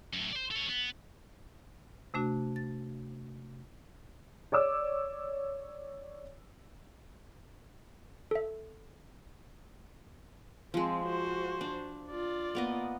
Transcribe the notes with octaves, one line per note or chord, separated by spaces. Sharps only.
F#2 A2
C5 D5
A4 C#5
B3
C3 A3 D4 F#4
A6
C#5 D5 D6 E6
A4 E5
F3 G#3 C4
F#4 C5
D4
F4 D5
A#3 B3 D#5